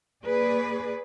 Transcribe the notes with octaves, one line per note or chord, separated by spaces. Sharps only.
A#3 G#4 B4 D5